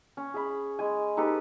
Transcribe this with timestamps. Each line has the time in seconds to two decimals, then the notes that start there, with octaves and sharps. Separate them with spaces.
0.17 C#4
0.34 G#4 B5
0.79 G#3 G#5
1.17 D#4 G4 A4 B4